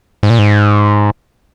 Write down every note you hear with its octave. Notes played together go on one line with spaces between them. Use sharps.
G#2
A#2
G#2